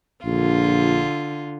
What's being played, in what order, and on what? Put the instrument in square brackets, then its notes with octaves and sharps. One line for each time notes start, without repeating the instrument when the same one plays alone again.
[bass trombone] A#1 [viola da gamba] D3 F4